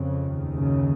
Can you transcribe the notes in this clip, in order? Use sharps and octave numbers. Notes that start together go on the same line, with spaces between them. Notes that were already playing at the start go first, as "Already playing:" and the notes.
Already playing: F2 C#3
D#2 D#3
F#2 C#3